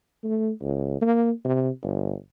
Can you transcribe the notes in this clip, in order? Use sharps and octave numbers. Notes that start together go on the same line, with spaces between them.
A3
C#2
A#3
C3
G1